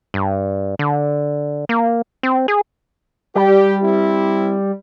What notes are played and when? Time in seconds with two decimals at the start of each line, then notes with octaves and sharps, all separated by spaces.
0.14 G2
0.79 D3
1.69 A#3
2.23 C4
2.48 G#4
3.35 G3 G4
3.83 C4 E4